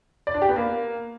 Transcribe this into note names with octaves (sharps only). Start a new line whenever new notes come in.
D5
D4
G4
B3
A#3